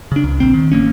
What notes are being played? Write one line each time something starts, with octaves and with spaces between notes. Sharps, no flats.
C#3 D4
C#2
A#1 C4
D#3
A1 F#3 A#3 C#4